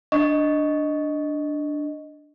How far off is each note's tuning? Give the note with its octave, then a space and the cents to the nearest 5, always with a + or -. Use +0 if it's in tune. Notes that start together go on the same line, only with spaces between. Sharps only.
D4 +0 D#5 +0 C#6 +5